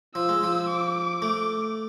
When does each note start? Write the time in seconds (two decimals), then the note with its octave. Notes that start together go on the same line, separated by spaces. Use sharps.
0.15 F3 E6
0.29 G#3
0.43 F3
0.69 D6
1.22 A3